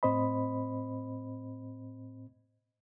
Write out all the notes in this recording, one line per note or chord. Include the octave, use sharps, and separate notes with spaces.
A2 C4 C5 D#5 B5